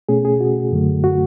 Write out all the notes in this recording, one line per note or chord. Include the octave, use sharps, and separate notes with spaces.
B2 A3 C#4 G#4
G#4
F#4
F#2 D3 F#3 A3
F#4